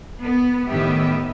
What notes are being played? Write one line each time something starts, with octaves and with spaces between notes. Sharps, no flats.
B3
A2 D#3 B3 G4 E5